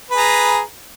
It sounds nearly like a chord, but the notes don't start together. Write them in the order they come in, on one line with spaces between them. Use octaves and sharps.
B4 G#4 A#5